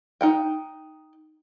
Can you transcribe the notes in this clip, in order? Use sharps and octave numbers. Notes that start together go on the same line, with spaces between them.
D#4 F#5 G5